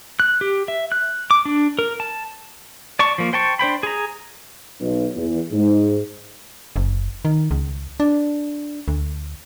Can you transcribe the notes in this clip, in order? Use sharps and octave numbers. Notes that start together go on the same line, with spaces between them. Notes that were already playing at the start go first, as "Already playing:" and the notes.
F#6
G4
E5
F#6
D6
D4
A#4
A5
D5 A5 C#6
F3 A#3
C5 G5 A5 C#6
D4 C5 G5 B5
G#4 A#5
B1
E2
G#2
F#1
D#3
C#2
D4
D2